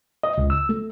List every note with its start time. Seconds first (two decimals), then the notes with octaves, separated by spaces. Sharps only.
0.23 D#5
0.38 C#2
0.50 E6
0.69 A3